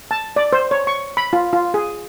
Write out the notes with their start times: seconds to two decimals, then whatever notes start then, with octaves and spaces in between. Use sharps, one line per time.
0.11 A5
0.36 D5
0.53 C5
0.71 C#5
0.87 C#6
1.17 B5
1.33 F4
1.53 F4
1.74 G#4